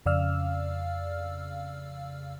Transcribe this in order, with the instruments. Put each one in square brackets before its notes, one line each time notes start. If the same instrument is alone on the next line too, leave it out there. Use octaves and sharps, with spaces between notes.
[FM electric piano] F2 C#3 D5 F5 E6 F6